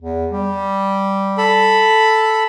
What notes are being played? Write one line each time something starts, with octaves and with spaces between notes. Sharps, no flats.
E2
G3
A4 B5